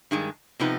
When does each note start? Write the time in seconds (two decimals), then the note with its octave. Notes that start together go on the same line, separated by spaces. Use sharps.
0.11 G2 D#3 G#3
0.60 C3 F3 B3 D#4 B4